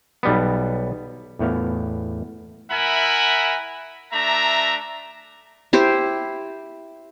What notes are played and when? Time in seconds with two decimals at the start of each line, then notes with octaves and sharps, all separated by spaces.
0.23 B1 G3 B3
1.39 E2 A2 B3 F5
2.71 E4 A#4 E5 F#5 G#5 B5
4.12 A3 D4 E5 A#5
5.73 E4 G4 C5